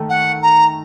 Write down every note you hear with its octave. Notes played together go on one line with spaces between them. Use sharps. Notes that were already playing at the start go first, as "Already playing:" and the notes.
Already playing: D#3 A3
F#5
A#5